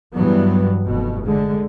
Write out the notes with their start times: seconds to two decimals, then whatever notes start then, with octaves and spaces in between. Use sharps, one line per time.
0.14 G2 E3 F#3 B3
0.85 F1 B2
1.25 D3 G#3